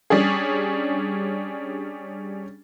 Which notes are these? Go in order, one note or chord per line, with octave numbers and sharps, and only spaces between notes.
G3 C#4 D4 G#4